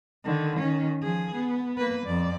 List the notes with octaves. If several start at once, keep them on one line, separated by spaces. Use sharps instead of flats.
D3 D#3
D#3 C#4
F3 G#4
B3
A#3 B4
F2 D5